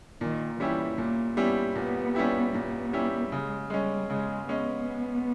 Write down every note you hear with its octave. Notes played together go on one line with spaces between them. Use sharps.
A#2 D#3
E3 G3 C#4 E4 G4
A#2 A#3
G3 B3 C#4 E4 G4
A#2 B3
G3 C#4 E4 G4
A#2 B3
G3 C#4 E4 G4
C#3 G#3
G3 G#3 C#4
C#3 G#3
G#3 B3 C#4